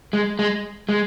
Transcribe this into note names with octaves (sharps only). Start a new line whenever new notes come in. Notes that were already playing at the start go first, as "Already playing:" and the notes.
G#3
G#3
G#3